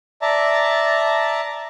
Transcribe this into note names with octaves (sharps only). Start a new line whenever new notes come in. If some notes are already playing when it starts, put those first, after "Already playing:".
D5 E5 A5 A#5